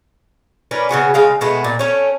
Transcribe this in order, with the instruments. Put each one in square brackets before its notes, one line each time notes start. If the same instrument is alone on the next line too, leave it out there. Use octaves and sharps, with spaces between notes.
[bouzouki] C#4 A#4 B4 D5
C#3 B3 F#4 G#4
C#3 G#3 F5
B2 G#3 A3 B3
A#2
A3 C#4 C#5